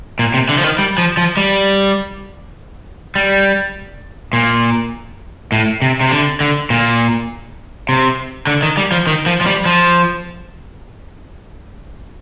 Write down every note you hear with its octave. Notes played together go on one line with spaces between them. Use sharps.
A#2
C3
D3
F3
D#3
G3
F3
F3
G3
G3
A#2
A2
C3
C3
D3
D3
A#2
C3
D3
D#3
G3
F3
D#3
F3
F3
G3
F3